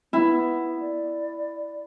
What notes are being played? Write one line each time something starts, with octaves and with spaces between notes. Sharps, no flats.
B3 E4
D5